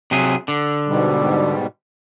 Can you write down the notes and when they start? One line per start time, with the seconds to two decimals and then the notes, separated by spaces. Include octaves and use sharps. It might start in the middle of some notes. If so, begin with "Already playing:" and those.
0.11 C3 F#3 G#4
0.48 D3
0.88 G#2 B2 G3